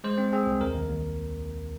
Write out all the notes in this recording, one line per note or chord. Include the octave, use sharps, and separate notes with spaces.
G#3 C5
C4
C4 G#4
C2
D#2 A#4
D#2
D#2